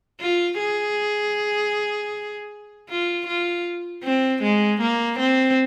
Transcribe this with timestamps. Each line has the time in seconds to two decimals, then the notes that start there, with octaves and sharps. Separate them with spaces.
0.21 F4
0.60 G#4
2.90 F4
3.27 F4
4.04 C4
4.43 G#3
4.81 A#3
5.19 C4